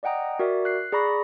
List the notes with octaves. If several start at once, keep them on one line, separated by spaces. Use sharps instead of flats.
D5 D#5 F#5 G5 A#5 D#6
F#4 A#4 D5 E5
F#6 C7
G#4 D5 A#5 B5 C#6 A#6